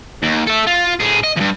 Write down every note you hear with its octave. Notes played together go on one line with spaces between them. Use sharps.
D#2
A4 E5
F4
A2 G#4
D#5
E2 G2